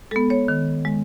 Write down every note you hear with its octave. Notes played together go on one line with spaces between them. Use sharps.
G#3 B3 A4
C#5
D#3
G#3